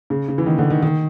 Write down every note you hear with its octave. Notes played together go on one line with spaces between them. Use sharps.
C#3
C#3
E3
D#3
D3
D#3
D#3